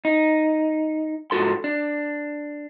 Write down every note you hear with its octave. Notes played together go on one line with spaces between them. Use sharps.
D#4
G#2 F4 F#4 A4 C6
D4